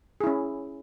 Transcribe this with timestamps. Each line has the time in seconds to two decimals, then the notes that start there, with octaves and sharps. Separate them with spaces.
0.20 G#4
0.24 E4
0.27 C#4